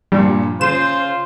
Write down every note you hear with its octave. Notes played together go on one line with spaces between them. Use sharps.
G2 A#2 F3 G3
C#3 F4 C5 E7